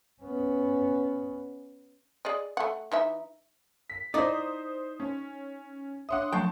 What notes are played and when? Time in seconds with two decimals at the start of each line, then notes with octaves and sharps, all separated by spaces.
0.23 B3 C#4
2.25 G#4 D5 D#5
2.57 A3 F#5
2.92 E3 D#4 E5
3.90 B6
4.14 D#4 E4 C5 D5 D6 D#6
5.00 C#4
6.09 D4 C#5 E5 F#5 C6 D#6
6.32 F3 F#3 A3 G5 A5 C#6